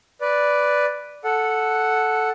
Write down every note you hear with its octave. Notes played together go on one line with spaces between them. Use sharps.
B4 D5
A4 F#5